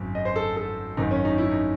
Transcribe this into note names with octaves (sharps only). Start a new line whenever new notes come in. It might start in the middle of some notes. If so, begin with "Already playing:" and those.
Already playing: G#1 F#2
D#5
C5
A4
A4
G#1 F#2 D#3 D#4
C#4
D#4
E4
D#4